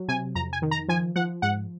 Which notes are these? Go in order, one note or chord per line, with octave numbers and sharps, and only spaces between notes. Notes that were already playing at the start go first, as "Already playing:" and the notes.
Already playing: F#3
C3 G#5
F2 A#5
G#5
D#3
A#5
F3 G#5
F3 F#5
G#2 F#5